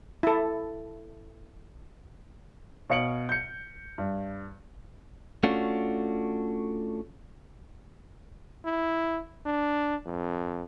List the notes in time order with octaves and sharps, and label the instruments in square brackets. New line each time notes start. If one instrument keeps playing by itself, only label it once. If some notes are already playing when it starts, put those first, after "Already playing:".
[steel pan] E4 A4
[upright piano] B2 C#5 F5 C#7 D7 F#7
G6 C#7
G2
[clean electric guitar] A3 C#4 D4 F4 F#4
[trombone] E4
D4
F2